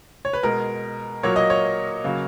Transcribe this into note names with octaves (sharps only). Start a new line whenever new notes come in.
C#5
B4
B2 G#3 A#4
A#2 F#3 A#3 C#5
D#5
C#5
C#3 F#3 A#3